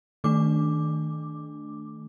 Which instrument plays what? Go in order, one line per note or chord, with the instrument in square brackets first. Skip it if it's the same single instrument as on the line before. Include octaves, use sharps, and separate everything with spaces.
[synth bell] D#3 A3 D4 D6